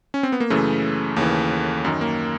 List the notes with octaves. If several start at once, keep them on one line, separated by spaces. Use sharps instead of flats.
C#4
C4
B3
A#3
F#2 C#3 E3 A3
D#2 C#3 E3
F#2 D#3
A#3